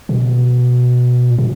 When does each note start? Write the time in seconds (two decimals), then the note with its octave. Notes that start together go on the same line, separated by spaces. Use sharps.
0.09 B2
1.31 A#2
1.38 B2